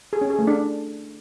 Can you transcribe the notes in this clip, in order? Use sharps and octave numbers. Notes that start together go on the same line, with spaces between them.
G#4
C#4
G#4
A3
D4